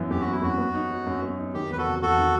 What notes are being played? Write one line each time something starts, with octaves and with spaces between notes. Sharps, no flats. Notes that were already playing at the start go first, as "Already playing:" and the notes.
Already playing: F#2 E3 B3 E4
F#2 G4
F#4
B3
E4
F#2 F#4
B3
D#4
F#3
F#2
B3
D#4
D#3 G4
E2 B4
F#4 A4
C3
E2 F#4 A4
D#3